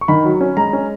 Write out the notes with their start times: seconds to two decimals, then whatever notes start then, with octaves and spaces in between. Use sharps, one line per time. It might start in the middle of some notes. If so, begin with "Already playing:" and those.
0.01 C#6
0.08 D#3 B5
0.25 F#3
0.41 C#4
0.57 G#3 A#5
0.73 C#4